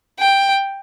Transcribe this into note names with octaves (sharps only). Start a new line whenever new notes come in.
G5